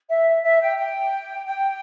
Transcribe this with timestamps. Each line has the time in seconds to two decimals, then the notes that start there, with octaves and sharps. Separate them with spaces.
0.09 E5
0.43 E5
0.60 G5
0.77 G5
1.45 G5